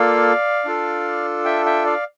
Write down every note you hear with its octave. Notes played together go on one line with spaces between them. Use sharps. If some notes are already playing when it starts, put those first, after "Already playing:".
Already playing: A#3 F4 A4 D5 F5
D4 F4 A4
E5 G5
E5 G5
D5 F5